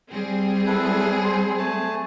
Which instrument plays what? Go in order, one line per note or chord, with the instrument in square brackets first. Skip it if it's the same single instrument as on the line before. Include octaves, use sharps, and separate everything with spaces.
[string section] G3 C4 G#4
[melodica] E4 A4 B4
C5
A3 G#5 A5